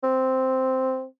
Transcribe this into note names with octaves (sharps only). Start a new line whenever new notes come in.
C4